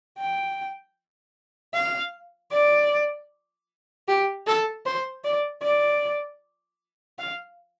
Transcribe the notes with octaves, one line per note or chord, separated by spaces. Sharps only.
G5
F5
D5
G4
A4
C5
D5
D5
F5